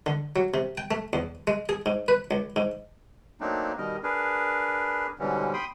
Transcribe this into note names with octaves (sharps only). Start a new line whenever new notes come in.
D3
F#3
C3
G5
A3
E2
G#3
G#4
G#2
B4
C#2
G#2
F#3 A3 A#3 C4 D4 D#4
B2 D#3 G3 A#4 D#5
D4 G#4 A#4 B4
G#2 B2 D3 E3 G3 C#4
G5 B5 C6 D#6